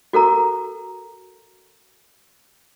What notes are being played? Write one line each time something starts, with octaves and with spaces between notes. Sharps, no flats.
F#4 A4 A#4 A#5